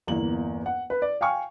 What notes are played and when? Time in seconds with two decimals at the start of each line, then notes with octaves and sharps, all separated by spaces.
0.07 G1 E2 A#3 F#7
0.66 F#5
0.90 B4
1.02 D5
1.21 F5 G5 G#5 C#6 F6